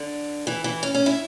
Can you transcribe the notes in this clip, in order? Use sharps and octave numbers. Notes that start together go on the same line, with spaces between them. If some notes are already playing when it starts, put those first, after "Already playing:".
Already playing: D3
E3
E3
C#4
C#4
E4